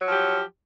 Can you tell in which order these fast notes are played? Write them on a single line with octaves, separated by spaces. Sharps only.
F#3 F3 G4